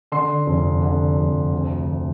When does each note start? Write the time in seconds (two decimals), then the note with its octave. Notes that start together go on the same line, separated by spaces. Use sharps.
0.12 D3 C6
0.47 F1
0.82 D3
1.17 F1
1.53 D2
1.87 D2